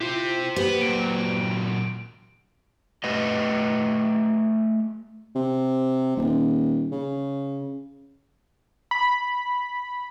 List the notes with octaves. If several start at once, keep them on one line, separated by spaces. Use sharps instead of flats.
E4 F4 G4 C5
A#3 B3 G4 B4 C5
A#2 F#3 D7
A3 G4 B4 D#5
C3
D#1
C#3
B5